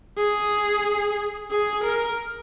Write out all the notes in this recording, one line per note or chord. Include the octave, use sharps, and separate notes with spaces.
G#4
G#4
A#4